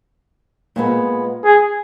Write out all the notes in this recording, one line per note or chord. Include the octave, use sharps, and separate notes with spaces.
A#2 G#3 B3
G#4